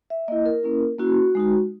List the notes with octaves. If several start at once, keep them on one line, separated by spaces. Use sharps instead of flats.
E5
A#3 E4 D#5
A#4
A#3 C#4 E4
A#3 C#4 E4 F#4
G#3 D#4 F#4